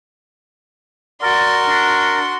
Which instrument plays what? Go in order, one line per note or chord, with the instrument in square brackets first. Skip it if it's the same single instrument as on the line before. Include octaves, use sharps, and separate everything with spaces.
[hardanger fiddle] F#4 C6 [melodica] A#4 [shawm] D5
[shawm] D4